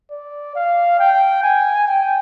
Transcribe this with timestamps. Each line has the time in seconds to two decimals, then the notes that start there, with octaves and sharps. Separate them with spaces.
0.11 D5
0.55 F5
0.99 G5
1.43 G#5
1.88 G5